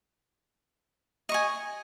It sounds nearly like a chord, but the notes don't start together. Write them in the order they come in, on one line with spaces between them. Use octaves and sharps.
D#5 C#6 G#5